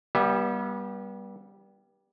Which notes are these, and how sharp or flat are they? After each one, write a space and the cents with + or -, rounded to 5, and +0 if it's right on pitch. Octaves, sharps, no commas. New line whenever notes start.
G3 +0 B3 -35 E5 +0